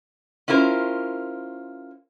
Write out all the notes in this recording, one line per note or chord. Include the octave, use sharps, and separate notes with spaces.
C#4 E4 F4 A#4 C5